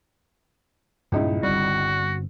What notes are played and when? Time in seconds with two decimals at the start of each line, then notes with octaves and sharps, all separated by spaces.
1.12 C#2 G2 A#2 D#4 E4
1.43 G1 G3 C4 F#4